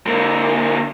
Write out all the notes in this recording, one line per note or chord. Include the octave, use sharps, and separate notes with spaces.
D3 A#3